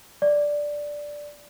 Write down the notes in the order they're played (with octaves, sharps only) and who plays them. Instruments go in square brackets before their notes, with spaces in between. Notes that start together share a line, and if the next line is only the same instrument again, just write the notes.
[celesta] D5